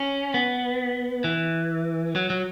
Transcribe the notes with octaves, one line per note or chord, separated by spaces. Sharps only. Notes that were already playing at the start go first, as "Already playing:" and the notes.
Already playing: C#4
B3
E3
F#3
F#3